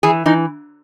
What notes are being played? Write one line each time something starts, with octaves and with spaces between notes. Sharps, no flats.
E3 G#4
E3 D#4